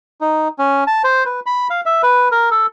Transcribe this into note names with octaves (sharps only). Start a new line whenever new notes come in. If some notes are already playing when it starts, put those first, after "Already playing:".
D#4
C#4
A5
C5
B4
B5
F5
E5
B4
A#4
A4